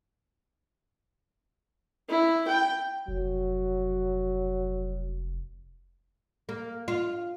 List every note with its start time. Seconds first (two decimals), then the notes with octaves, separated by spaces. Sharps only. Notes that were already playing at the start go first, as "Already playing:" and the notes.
2.09 E4
2.48 G5
3.08 F1 F#3
6.49 A#3
6.88 F4